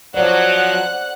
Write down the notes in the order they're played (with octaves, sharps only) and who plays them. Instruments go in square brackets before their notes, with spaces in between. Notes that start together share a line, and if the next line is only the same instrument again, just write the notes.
[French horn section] F3 F#3 [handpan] C5 D5 [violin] F#5 F#6